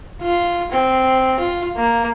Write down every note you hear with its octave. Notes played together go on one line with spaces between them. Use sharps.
F4
C4
F4
A#3